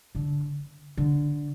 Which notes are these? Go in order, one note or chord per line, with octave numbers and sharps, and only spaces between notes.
D3
D3